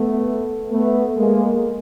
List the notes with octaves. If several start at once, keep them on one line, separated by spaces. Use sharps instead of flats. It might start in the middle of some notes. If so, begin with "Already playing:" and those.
Already playing: A3 B3
A3 B3
G#3 A#3